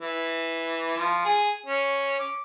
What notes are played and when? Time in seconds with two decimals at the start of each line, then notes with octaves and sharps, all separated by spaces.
0.01 E3
0.97 F3
1.25 G#4
1.66 C#4
2.19 D6